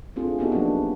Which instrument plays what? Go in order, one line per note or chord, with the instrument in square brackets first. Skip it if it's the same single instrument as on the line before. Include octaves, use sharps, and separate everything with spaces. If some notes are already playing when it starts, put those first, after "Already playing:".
[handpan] A3 C4 D4 F4 G#4
B3 D#4 F#4 G4 A4
F3 F#3 A#3 B3 D4